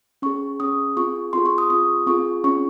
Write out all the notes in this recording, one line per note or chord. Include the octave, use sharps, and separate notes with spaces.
C#4 G#4 C#6
C#4 G#4 D#6
C4 F4 G#4 C#6
C4 F4 G#4 C6
C#6
D#6
C4 F4 G#4 D#6
C4 F4 G#4 C#6
C#4 F4 G#4 C#6